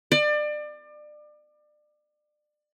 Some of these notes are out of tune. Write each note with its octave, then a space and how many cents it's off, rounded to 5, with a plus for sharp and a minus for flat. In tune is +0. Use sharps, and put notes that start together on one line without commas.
D5 +30